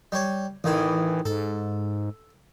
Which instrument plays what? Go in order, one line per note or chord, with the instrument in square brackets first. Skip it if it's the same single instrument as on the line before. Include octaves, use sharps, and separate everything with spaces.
[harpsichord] G3 C#5
[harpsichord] A1 D#3 G#4 [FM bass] E3
[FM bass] G#2 [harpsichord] A4